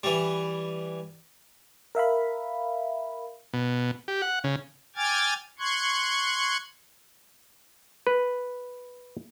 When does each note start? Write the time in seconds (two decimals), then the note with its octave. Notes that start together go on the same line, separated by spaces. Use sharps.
0.03 E3 G3
1.95 A#4 E5 F5 B5
3.53 B2
4.08 G4
4.22 F#5
4.44 C#3
4.96 G5 G#5 D6 F6 G#6 A6
5.59 C6 C#6 F#6 G#6
8.07 B4